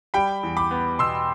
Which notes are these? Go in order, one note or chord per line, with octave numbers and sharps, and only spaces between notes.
G3 G5 B5
E2
B5 D6
B3
B2 C6 E6